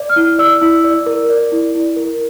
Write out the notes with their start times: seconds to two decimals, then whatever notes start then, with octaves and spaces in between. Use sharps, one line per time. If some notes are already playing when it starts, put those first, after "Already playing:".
Already playing: D5
0.10 F6
0.16 E4
0.39 D5 E6
0.61 E4
0.84 D5
1.06 A#4
1.30 D5
1.52 E4
1.75 E4
1.96 A#4